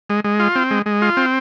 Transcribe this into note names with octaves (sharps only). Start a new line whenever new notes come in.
G#3
G#3
F4
C4
G#3
G#3
F4
C4